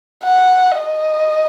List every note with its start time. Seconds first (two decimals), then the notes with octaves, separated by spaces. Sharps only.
0.24 F#5
0.80 D#5